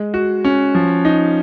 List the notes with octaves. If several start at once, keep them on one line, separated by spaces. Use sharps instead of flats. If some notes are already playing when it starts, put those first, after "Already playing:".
Already playing: G#3
F#4
C#4
F3
D#4